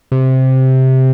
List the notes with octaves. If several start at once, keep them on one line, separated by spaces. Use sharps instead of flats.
C3